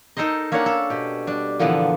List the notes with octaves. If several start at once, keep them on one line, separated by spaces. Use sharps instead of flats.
D#4 A4 A#4 C5 D#5
A#3 C#4 D4 A#4 C#5 F#5
A4
B2 G4
G3 D4
A#2 D3 E3 F3 B3